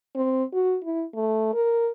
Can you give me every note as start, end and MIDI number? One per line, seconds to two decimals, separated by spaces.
0.16 0.44 60
0.53 0.77 66
0.84 1.05 64
1.15 1.51 57
1.54 1.90 70